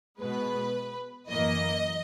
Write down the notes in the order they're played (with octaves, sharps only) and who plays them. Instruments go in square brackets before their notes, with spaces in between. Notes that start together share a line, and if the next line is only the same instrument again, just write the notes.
[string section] B2 G#3 B3 B4
F#2 E3 A#3 D#5